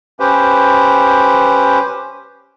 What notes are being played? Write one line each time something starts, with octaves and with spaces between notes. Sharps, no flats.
C#4 G4 B4 C5